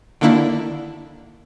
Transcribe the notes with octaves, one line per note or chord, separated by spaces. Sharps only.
D3 D#3 A#3 D4 E4